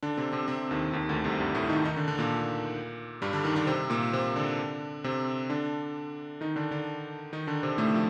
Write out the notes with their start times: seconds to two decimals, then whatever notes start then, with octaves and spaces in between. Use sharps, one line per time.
0.03 D3 D4
0.17 C3 C4
0.33 C3 C4
0.48 C3 C4
0.71 D#2 D#3
0.93 D#2 D#3
1.09 D2 D3
1.24 C2 C3
1.39 G2 G3
1.55 A2 A3
1.69 D#3 D#4
1.85 D#3 D#4
1.96 D3 D4
2.08 D3 D4
2.19 A#2 A#3
3.22 G2 G3
3.33 D3 D4
3.44 D#3 D#4
3.56 D3 D4
3.67 C3 C4
3.90 A#2 A#3
4.13 C3 C4
4.36 D3 D4
5.04 C3 C4
5.50 D3 D4
6.41 D#3 D#4
6.56 D3 D4
6.71 D3 D4
7.33 D#3 D#4
7.47 D3 D4
7.63 C3 C4
7.78 A2 A3
7.94 F3